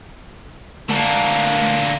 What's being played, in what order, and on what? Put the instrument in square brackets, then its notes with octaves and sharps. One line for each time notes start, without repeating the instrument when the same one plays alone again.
[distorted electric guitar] D3 A#3 [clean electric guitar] A3 A#4 A5